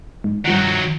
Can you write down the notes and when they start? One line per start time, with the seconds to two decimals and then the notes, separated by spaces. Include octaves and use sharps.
0.24 G#2
0.45 G2 D#3 F3 F#3 F#5